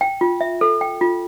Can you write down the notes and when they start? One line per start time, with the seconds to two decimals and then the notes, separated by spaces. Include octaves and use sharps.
0.01 G5
0.21 F4
0.41 E5
0.61 A4
0.81 G5
1.01 F4